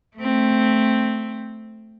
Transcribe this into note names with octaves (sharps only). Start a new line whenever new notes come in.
A3 C4